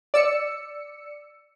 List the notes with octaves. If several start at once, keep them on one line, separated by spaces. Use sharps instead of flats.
D5 E6 C#7